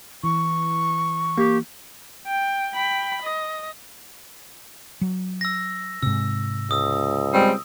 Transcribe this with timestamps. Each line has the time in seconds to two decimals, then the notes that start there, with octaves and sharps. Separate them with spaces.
0.24 E3 C#6
1.38 A#3 G4
2.27 G5
2.75 G5 B5
3.22 D#5
5.01 F#3
5.41 E6 A#6
6.02 G#2 C3 E6
6.71 C#2 D#6 E6
7.33 G3 G#3 C4